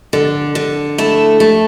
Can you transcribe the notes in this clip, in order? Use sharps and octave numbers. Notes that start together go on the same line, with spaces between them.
D3
D3
A3 E4
A3